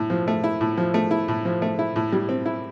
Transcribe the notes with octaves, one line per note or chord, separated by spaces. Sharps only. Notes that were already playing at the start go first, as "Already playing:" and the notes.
Already playing: A2
F3
A3
E4
A2
F3
A3
E4
A2
F3
A3
E4
A2
G3
C4
E4